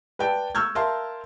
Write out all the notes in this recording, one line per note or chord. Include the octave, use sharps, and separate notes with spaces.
B4 D5 G5 A5
C#6 E6 F6 G6 G#6
A#4 E5 F5 A5 C6